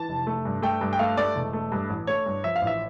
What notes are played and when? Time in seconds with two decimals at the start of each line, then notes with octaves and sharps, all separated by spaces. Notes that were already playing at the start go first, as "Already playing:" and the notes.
Already playing: E3 A5
0.09 F1
0.27 A3
0.45 G2
0.62 A3 G5
0.81 G2
0.93 G5
0.99 A3 F5
1.17 A3 D5
1.35 E1
1.53 A3
1.72 G2
1.90 A1
2.07 A3 C#5
2.26 G2
2.44 F3 E5
2.56 F5
2.62 A1
2.67 E5